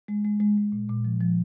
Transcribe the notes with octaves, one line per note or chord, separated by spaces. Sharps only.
G#3
G#3
G#3
G#3
A#2
A#2
F3
F3